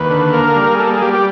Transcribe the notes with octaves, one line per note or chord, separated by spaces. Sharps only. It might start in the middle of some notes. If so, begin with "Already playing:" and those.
Already playing: D#2 B4
D3
A#3 A#4
G3
G#4
A#3 A4
G#4
G3 G4
G4